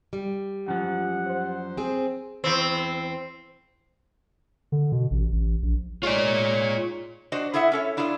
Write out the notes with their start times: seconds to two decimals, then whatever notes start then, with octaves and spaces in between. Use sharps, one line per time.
0.13 G3
0.68 F#2 F3 F#5
1.27 C5
1.77 C4 G#4
2.44 E2 C4
4.72 D3
4.92 B2
5.11 A1
5.32 A1
5.63 A#1
6.03 G#3 D#4 F4 C#5 D5
7.32 D4 F#4 C5 D#5
7.54 E4 G#4 A4 E5 F#5
7.72 C#4 A4 C#5
7.97 D4 E4 F4 G#4 A4